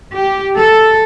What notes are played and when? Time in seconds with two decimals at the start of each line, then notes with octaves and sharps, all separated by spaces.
0.16 G4
0.57 A4